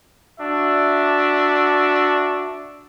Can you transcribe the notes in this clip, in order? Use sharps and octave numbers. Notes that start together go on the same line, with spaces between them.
D4 F#4 E5